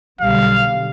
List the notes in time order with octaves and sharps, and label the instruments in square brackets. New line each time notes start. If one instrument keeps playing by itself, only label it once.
[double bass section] B1 D3 G3 [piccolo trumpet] F5